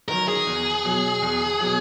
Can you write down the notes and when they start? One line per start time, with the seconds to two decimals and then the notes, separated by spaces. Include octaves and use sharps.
0.08 D#3 F#3 A#4
0.28 G#4
0.47 E2
0.85 B2 F#3
1.22 E2
1.60 B2 F#3